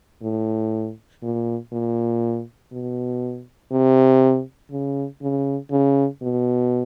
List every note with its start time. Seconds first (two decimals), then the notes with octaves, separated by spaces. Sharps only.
0.22 A2
1.23 A#2
1.73 A#2
2.73 B2
3.72 C3
4.71 C#3
5.22 C#3
5.71 C#3
6.22 B2